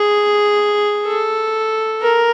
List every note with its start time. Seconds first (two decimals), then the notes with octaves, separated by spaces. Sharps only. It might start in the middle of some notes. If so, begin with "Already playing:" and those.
Already playing: G#4
1.06 A4
2.02 A#4